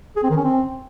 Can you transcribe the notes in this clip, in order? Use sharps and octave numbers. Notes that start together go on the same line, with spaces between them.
G#4
C4
D#3
C#4
C4